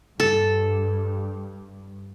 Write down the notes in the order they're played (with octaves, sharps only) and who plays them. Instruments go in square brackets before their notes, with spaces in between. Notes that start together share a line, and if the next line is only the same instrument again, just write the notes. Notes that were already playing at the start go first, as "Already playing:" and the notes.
[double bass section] G2 [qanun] A4